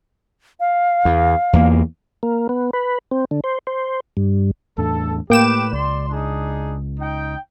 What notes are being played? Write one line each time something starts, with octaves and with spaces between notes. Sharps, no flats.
F5
E2
E2 A#3
A#3
B3
B4
C4
D3
C5
C5
G2
E2 A2 D4 A4
A2 A#3 G4 B4 G5 D6 E7
C#2 D5 C6
D4 D#4 G#4
D#4 G5